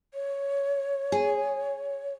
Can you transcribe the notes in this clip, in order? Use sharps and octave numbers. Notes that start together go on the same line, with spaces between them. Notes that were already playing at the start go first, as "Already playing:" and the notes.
C#5
G#4